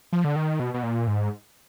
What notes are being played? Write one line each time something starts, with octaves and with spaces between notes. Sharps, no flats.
F3
D3
D#3
B2
B2
A#2
G#2